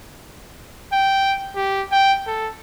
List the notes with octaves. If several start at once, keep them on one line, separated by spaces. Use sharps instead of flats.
G5
G4
G5
A4